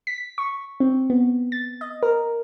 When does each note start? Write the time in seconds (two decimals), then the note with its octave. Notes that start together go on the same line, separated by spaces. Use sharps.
0.07 B6
0.38 C#6
0.80 C4
1.10 B3
1.52 A6
1.81 D#5
2.03 A#4